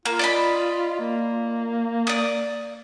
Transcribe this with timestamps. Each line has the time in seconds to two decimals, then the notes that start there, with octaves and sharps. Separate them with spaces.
0.05 A#3 F4
0.19 D5 D#5 B5
1.00 A#3
2.07 D5 D#6